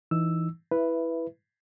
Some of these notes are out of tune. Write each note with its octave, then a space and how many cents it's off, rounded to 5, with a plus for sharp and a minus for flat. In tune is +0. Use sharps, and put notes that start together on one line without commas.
E3 +0 D#4 -10 E6 +0
E4 +0 B4 +0 E5 +15